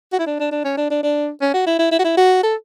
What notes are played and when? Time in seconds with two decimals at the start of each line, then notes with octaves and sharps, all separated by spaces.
0.13 F#4
0.19 E4
0.27 D4
0.40 D4
0.51 D4
0.64 C#4
0.77 D4
0.90 D4
1.03 D4
1.42 C#4
1.54 F#4
1.66 E4
1.79 E4
1.92 E4
1.99 F#4
2.04 E4
2.17 F#4
2.43 A4